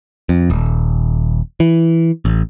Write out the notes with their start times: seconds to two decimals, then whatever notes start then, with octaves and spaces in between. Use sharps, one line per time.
0.29 F2
0.50 D#1
1.60 E3
2.25 A1